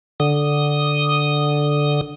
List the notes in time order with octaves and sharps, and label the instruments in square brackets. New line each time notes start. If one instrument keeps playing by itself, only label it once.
[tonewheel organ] D3 D#6